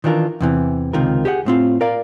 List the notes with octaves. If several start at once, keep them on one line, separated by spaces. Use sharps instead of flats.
D#3 E3 D4 F4 A#4
E2 C3 E3
C#2 C3 D#3 F4 A#4
G4 G#4 C#5 F#5
A2 C4 F4
A#4 D5 F5